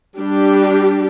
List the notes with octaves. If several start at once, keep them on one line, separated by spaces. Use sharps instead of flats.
G3 D4 G4